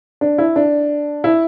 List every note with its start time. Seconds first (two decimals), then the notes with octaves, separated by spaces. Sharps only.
0.21 D4
0.38 E4
0.56 D4
1.24 E4